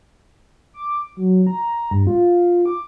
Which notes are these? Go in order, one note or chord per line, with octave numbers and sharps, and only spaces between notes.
D6
F#3
A#5
G2
F4
D6